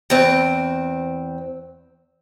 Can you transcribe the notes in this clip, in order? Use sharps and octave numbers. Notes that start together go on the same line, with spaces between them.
E2 C4